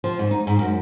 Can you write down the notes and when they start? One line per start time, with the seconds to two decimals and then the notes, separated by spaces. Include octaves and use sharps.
0.04 F3
0.19 G#2
0.31 D#4
0.47 G#2
0.59 F#2